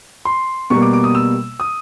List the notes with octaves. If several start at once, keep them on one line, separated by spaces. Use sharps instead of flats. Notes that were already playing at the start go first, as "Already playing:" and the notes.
C6
B2 G3 A#3 C#6
D6
D6
D#6
E6
D#6